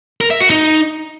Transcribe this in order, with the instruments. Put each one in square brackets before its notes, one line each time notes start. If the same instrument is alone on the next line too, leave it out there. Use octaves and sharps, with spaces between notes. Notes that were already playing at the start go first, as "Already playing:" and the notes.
[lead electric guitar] A#4
E5
F#4
D#4